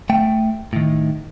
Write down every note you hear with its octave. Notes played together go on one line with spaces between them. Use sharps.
A3 G5
A2 D#3